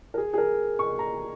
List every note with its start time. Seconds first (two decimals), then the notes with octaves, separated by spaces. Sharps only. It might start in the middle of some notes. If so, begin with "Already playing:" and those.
0.14 A#4
0.18 G#4
0.34 G#4
0.38 A#4
0.79 C#6
0.99 A#5